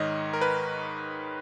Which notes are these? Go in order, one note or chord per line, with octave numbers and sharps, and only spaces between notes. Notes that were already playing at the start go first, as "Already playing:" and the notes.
Already playing: G#2 D#3 C#5 D#5
A#4
B4